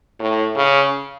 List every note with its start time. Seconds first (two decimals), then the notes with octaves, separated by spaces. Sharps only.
0.20 A2
0.56 C#3